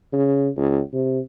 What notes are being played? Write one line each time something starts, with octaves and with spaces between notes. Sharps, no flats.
C#3
C#2
C3